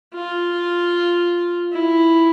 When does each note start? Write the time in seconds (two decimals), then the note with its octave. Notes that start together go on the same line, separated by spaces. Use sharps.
0.14 F4
1.72 E4